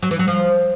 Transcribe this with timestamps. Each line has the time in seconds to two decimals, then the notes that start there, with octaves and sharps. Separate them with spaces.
0.03 F#3
0.11 E3
0.19 F#3
0.28 F3